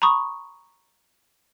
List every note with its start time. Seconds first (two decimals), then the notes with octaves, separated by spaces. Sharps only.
0.02 A#5 B5 C#6 D#6